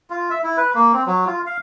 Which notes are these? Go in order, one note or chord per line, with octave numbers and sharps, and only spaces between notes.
F4
E5
E4
B4
A#3
C4
F#3
F4
F5